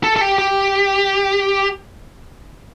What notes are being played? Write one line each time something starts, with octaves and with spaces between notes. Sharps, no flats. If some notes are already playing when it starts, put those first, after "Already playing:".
A4
A4
G4
G4